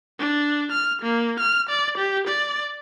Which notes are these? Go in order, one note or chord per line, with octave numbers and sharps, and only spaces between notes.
D4
F6
A#3
F6
D5
G4
D5